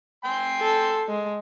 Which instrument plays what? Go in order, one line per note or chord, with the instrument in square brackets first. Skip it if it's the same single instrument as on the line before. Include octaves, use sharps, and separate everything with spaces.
[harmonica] G5 G#5 C6
[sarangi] A4
G#3